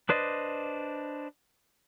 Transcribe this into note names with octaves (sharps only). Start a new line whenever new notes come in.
D4 B4 C5 D5 D#5